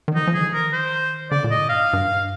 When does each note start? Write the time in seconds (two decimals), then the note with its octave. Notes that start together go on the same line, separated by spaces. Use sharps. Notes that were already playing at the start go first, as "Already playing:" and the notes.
0.08 D#3
0.15 F3 D#4
0.27 F3
0.34 G#4
0.41 D3
0.53 D#3 A#4
0.73 C5
1.31 D3 D5
1.44 A#2
1.51 D#5
1.57 G#2
1.70 G2 F5
1.82 G#2
1.93 G2